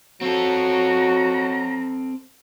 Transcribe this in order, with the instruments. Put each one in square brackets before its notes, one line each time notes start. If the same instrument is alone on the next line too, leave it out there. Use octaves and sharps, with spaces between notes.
[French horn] F#3 [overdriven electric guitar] C4 A4 [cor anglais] F#4 [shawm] A#5